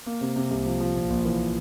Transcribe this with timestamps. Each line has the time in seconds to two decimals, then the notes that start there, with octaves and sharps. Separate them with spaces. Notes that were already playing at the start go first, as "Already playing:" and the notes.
0.06 A#3
0.21 C3
0.36 C3
0.51 C2
0.66 F3
0.81 F3
0.95 A#1
1.10 A#1
1.25 E3